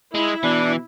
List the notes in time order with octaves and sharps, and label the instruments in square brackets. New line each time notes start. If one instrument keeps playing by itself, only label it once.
[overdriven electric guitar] G#3 [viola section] E4
[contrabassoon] B2 [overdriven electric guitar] E3 [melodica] D4